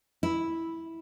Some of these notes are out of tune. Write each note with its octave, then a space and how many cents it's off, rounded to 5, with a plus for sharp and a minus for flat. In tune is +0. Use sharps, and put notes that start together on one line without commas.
E4 -5